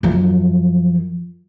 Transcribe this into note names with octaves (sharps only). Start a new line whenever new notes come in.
F#2 F3